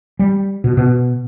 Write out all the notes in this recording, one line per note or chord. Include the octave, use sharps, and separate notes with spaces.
G3
B2
B2